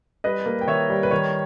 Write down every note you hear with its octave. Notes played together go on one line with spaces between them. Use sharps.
G3 B4 D#5
A#3
G5
D#3 C#5 E5
G3
B4
D#3 C#5